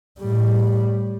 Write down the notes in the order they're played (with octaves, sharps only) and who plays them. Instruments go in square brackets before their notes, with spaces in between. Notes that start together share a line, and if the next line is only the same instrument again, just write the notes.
[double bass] A2 G3